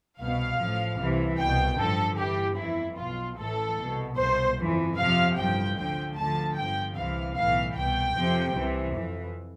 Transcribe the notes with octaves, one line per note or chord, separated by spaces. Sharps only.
C2 B2 F5
A1 A2 F3
C2 C3 E3
C2 B2 G5
A1 G2 D3 F3 A4
G1 G2 E3 G4
G1 F2 E3 E4
B1 B2 F4
A1 A2 E3 A4
C2 B2
C2 B2 C5
G1 F2 E3
F2 C3 F3 F5
A1 G2 F3 G5
D2 D3 F3 G5
D2 D3 F3 A5
G1 G2 F3 G5
C2 C3 E3 F5
B1 A2 E3 F5
C2 B2 G5
F2 C3 F3
C2 C3 E3
F2 E3